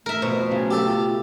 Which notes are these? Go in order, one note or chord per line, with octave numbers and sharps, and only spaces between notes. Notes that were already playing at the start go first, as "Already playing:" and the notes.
A3 A#4 E5
F2 B2 C5
C#3 F#3 C4
G4 A4
F4